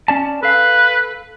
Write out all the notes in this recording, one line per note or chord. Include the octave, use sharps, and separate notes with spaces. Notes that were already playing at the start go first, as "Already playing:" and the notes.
C#4 D5 A5
A4 B4 F5